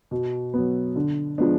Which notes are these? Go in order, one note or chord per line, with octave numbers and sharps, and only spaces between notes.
B2
F#3 B3
D3
F3 G#3 B3 D4